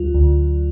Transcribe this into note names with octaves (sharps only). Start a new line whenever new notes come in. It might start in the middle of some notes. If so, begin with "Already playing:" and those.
Already playing: D2 F#3 F4
D2